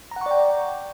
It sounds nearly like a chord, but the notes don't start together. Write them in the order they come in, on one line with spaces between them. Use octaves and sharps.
A#5 F#5 C#6 D5 G5